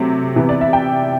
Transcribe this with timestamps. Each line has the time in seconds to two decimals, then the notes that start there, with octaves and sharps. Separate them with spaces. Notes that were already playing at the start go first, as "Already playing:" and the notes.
Already playing: C3 F#3 A3 C4
0.36 C3 E3 B3
0.49 D5
0.61 E5
0.73 G5